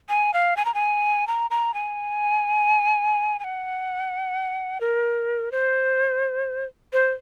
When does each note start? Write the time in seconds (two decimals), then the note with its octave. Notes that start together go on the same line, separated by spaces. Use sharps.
0.09 G#5
0.34 F5
0.57 G#5
0.65 A#5
0.74 G#5
1.27 A#5
1.51 A#5
1.74 G#5
3.39 G#5
3.44 F#5
4.81 A#4
5.52 C5
6.93 C5